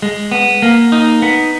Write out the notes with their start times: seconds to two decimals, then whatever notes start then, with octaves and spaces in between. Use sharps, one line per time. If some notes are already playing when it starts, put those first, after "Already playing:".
0.02 G#3
0.32 B3
0.62 A#3
0.92 D#4
1.22 B3